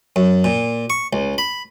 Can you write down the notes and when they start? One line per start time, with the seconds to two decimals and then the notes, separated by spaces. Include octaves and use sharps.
0.16 F#2
0.44 A#2
0.90 C#6
1.13 C#2
1.38 B5